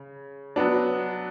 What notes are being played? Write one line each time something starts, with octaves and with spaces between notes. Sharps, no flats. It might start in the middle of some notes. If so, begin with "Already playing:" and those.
Already playing: C#3
F#3 B3 D4